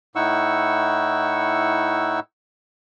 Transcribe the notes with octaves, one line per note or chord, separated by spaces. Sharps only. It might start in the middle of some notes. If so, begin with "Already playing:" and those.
A2 D#4 E4 F#5 C#6 E6